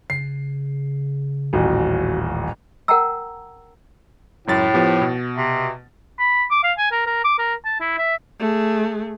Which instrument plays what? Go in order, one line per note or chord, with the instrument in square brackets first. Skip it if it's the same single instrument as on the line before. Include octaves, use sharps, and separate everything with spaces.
[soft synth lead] C#3 [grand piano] C7
[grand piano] D#1 A1 [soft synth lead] F#4
[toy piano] A#4 F#5 G5 A5 A#5 E6
[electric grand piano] C#2 F#2 A6 [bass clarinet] A2
[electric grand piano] F3 B3 G4
B2
[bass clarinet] C3
[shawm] B5
D6
F5
G#5
A#4
A#4
D6
A#4
A5
E4
E5
[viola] A3 G#4